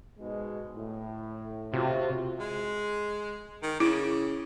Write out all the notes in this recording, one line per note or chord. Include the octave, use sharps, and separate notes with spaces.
G#2 B2 G#3
A2
C3 F4 F#4
G#3
D#3
C#3 E4